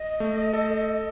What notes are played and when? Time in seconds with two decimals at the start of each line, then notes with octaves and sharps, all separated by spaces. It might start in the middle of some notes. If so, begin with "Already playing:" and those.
Already playing: D#5
0.20 A3
0.53 A4